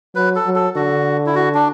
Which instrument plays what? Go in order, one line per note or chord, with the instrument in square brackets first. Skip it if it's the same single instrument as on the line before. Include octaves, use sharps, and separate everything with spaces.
[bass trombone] F#3 [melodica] B4
[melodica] A4
[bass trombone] F#3
[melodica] A4
[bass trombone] D3 [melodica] F#4
[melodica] E4
F#4
D4